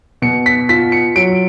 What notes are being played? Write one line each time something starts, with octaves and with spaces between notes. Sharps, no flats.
B2 C#7
B6
F4 B6
C#7
F#3 D7